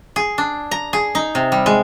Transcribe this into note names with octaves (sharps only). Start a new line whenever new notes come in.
G#4
D4
A#5
G#4
D#4
C3
G3
G#3